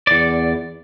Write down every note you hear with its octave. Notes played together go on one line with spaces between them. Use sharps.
E2 D5